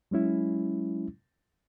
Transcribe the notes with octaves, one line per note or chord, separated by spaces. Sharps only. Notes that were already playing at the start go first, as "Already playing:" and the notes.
F#3 G#3 C#4 E4